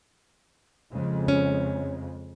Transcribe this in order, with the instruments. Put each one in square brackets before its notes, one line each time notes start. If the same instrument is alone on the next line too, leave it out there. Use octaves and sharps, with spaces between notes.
[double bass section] F2 C#3 G#3
[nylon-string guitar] C#4